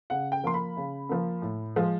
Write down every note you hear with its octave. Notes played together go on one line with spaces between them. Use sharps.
C#3 F#5
G5
F3 A#3 C6
B5
C#3
F3 A#3
A2
F3 G#3